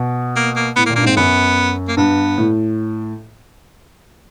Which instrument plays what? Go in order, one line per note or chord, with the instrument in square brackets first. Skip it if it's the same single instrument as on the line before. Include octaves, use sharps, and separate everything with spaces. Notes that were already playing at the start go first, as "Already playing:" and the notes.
Already playing: [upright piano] B2
[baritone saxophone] A#3
A#3
[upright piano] A2 [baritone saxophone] B3
[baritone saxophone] A#3
[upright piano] A#2
[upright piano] G2 [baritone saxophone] A#3
[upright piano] G#2 [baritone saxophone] C4
[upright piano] F#2 [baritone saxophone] B3
[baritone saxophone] A#3
[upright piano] G2 [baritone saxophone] B3
[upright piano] A2